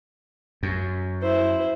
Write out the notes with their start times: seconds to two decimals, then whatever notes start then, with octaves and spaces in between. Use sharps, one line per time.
0.63 F#2
1.22 E4 C5